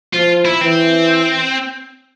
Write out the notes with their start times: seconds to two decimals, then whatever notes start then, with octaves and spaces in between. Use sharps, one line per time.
0.13 F3 F4
0.45 E4
0.61 E3 C4